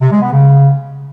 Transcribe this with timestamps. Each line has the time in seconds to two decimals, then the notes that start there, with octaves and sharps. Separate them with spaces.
0.01 C3
0.11 G#3
0.21 B3
0.32 C#3